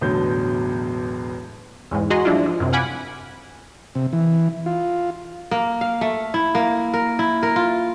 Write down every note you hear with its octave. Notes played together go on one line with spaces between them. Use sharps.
E1 A1 B2 D3 F#3 G6
E2 G#2 G#3
F#4 G#4 D#5 A#5 C6
F3 G3 D4 E4 F4
F3
F#2 C3
F5 F#5 G#5 B5 D6
C3
E3
F4
A#3
F5
A3
E4
A#3
A#4
E4
A#4
F4